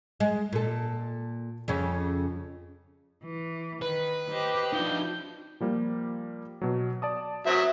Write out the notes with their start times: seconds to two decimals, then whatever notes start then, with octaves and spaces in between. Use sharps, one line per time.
0.20 G#3
0.52 A#2 A4
1.68 F2 C#3 C#4
3.22 E3
3.82 D#3 B4
4.30 G4 C5 D#5
4.73 F3 D4 D#4 F4 G6
5.60 F3 G3 A#3
6.61 B2 F#3
7.02 D5 A5 D#6
7.46 F#3 C5 E5 D#6